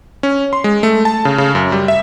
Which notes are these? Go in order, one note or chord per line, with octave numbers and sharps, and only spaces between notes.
C#4
C6
G#3
A3
A5
C#3
C#3
F#2
G3
E5